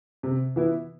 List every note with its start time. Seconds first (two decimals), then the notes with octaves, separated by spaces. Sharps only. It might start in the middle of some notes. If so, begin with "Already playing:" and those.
0.23 C3
0.56 E3 B3 E4